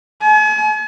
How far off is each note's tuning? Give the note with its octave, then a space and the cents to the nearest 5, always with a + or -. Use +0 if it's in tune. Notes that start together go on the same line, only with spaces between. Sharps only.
G#5 +40